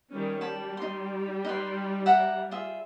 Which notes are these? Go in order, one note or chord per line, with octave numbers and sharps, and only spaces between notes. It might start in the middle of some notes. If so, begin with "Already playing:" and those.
D#3 G3 C#4
G3 A5 B5
D#4 C6
D#4 B4 C6
E5 F#5 A#5
F4 G#4 E5